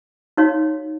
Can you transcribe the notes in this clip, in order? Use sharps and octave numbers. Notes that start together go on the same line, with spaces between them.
D#4 F#4 C#5 F5